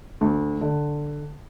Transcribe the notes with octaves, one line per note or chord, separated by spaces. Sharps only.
D2
D3